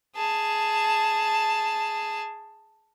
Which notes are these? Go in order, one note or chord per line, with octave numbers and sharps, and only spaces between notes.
G#4 A5